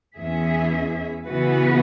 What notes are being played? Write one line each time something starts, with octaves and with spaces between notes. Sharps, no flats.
E2 E3 C#4 G#4 E5
C#3 E3 B3 F#4 B4